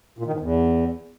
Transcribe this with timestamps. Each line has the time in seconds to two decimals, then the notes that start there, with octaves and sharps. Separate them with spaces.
0.19 A#2
0.26 D#3
0.33 G#2
0.40 E2